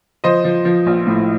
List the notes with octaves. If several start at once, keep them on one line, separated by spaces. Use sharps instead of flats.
F3 C5 D#5
F3
F3
A#1
A2